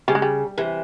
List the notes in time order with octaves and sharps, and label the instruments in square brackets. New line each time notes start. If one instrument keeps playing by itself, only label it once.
[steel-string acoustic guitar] C#3 [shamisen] G3
[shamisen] G#3
G3
[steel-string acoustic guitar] C3 E3